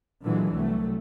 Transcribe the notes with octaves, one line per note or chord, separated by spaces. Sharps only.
A#2 D3 E3 F#3 G#3
C2 F#3 A3